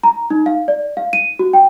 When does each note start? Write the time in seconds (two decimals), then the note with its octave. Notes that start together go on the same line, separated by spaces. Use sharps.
0.03 A#5
0.30 D#4
0.46 F5
0.68 D5
0.97 F5
1.13 D#7
1.39 F#4
1.53 G5